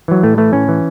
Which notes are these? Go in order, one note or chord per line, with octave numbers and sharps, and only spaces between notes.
E3 F#3
A2 A3
E3 A3
A2 C#4
E3